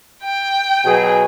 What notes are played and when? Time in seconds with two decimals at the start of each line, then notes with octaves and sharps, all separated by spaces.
0.24 G5
0.85 B2 F#3 G#4